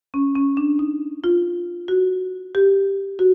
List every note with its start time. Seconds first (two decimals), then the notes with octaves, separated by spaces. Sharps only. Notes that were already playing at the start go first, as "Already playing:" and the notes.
0.14 C#4
0.35 C#4
0.57 D4
0.79 D#4
1.24 F4
1.88 F#4
2.55 G4
3.19 F#4